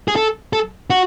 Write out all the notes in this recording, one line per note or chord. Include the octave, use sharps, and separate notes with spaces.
G#4
A4
A4
F#4